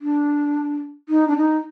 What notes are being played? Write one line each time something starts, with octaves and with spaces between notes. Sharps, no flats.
D4
D#4
D4
D#4